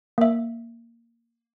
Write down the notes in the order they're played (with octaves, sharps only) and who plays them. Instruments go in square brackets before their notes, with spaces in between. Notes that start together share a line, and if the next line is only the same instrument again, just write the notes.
[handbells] A#3 E5